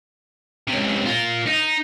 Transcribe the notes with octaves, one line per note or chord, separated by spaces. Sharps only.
C#2 C3
F4 A#4
D#4